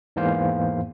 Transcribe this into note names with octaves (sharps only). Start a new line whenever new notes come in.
E2 G#2 E3 A#3 C5 F5